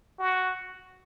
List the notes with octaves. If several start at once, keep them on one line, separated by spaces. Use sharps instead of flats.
F#4